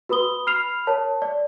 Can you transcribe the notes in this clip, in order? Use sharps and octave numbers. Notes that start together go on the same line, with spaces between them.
F#4 B4 B5 D#6 G7
B5 F6 C7 F7
A#4 C#5 A5
D5